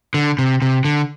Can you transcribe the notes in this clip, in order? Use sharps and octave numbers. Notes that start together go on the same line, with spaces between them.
D3
C3
C3
D3